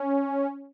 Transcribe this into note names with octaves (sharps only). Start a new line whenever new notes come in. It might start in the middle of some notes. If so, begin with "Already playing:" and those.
Already playing: C#4